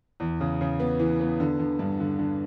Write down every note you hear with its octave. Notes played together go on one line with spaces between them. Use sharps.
E2
C#3
C#3
B3
E3
B3
D3
D3
G2
D3
D3